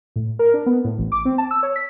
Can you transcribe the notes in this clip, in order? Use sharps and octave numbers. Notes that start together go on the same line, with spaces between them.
A2
A#4
D4
B3
A2
A1
D6
C4
A5
E6
C#5
B6